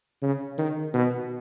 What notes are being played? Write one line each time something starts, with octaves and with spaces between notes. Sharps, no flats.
C#3
D#3
B2